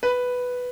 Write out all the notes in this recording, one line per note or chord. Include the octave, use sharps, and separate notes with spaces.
B4